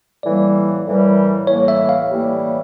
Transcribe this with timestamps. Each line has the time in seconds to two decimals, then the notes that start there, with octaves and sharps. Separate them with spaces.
0.23 A2 E3 G3 A#3 D5
0.85 A2 E3 G3 A#3
1.47 A2 E3 G3 A#3 C#5
1.68 E5
1.89 F5
2.10 A2 E3 G3 A#3